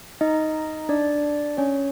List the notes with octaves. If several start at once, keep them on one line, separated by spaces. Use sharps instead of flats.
D#4 D#5
D4 D5
C#4 C#5